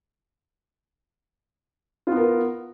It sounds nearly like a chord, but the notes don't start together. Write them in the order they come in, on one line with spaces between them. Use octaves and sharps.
F4 B3 A#4